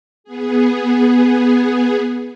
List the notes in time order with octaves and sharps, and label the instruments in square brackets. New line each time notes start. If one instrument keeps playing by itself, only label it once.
[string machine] B3 G#4